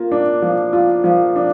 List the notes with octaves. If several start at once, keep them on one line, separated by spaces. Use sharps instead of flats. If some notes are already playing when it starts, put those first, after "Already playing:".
Already playing: A#3 F4
D4
F3
F4
F3
D4